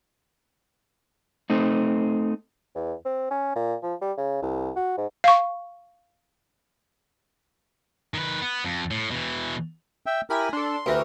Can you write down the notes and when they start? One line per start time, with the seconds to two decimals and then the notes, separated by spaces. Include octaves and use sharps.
1.50 A3 C4 D#4
2.75 E2
3.05 C4
3.31 C#4
3.55 A#2
3.83 F3
4.01 G3
4.17 C#3
4.42 C2
4.76 F#4
4.97 G#2
5.24 F5 C#6
8.14 D#3 B4
8.42 B3
8.64 F2
8.91 A2
9.11 B2 E3
10.06 E5 G5
10.30 E4 G4 A#4 G#5 B5 A#6
10.53 D4 A4 C6
10.86 D2 E3 F#4 G4 A#4